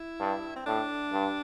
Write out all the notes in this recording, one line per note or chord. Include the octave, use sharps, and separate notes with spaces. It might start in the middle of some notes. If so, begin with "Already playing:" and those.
Already playing: E4
G2
C4
A2 D4
G2